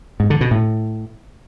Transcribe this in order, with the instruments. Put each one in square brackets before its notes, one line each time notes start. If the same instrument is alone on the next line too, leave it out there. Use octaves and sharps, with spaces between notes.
[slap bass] G#2
D3
B2
A2